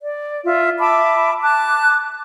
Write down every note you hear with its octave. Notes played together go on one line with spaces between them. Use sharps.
D5
F4 E5
E5 A5 B5 D6
A5 D6 F#6